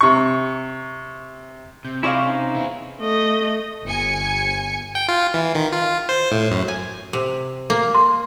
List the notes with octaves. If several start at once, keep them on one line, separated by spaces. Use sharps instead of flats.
C3 C#6
C3 G6
E4 F4 G#4 C5 D5 D#5 F5 C#6
C#4 D#4
B3 E4
A3 D#5
G1 G#5 C#7
G5
F4
E3
D#3
F4
C5
A2
F#2
G#5
C3
A#3
C6